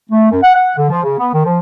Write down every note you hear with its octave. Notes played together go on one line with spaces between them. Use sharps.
A3
F#2
F#5
F#5
D3
F3
C#3
B3
D#3
F3